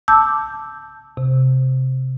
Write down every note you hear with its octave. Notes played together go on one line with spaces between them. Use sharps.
A5 D6 E6 G6
C3